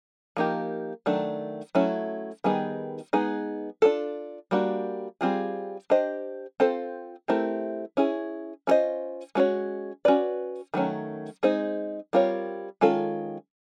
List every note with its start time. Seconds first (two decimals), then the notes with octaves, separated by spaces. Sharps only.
0.37 F3 A#3 D#4 G4 A#4
1.06 D#3 F#3 A3 D4
1.75 F#3 A3 C#4 E4
2.44 D#3 G3 B3 D#4 G#4
3.13 G#3 B3 D#4 G#4
3.82 D4 F4 A4
4.51 G3 A#3 D4 F#4
5.21 G3 C4 F4 G#4
5.90 D4 G4 C5 D#5
6.60 C4 F4 A4 C5
7.28 A3 C4 E4 G4 A#4
7.97 C#4 E4 G#4
8.67 C#4 F4 A4 C5 D#5
9.35 G#3 C#4 F#4 A4 C#5
10.05 C#4 F#4 B4 D5
10.74 D#3 F#3 A3 C#4
11.43 G#3 C4 D#4 G#4 C5
12.13 G3 C4 F4 A#4 C#5
12.81 D#3 G#3 C#4 F4 A4